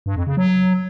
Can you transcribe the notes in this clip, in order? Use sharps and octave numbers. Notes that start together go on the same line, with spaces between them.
G2
F2
C#3
F#3